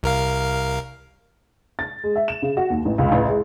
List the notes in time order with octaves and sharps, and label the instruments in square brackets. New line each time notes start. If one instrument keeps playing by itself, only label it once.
[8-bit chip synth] C2 A#4 F5
[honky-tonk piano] A6
G#3
E5
E7
C#3
F#4
D#2
A1
C#2
A1
G#3